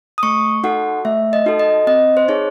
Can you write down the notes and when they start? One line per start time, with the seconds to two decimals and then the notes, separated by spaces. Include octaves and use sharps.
0.18 D#6
0.23 A3 C#6
0.64 D#4 F#4 A4 F#5
1.05 A3 E5
1.33 D#5
1.46 D#4 F#4 A4
1.60 D#5
1.87 C4 D#5
2.17 C5
2.28 D#4 G#4 C#5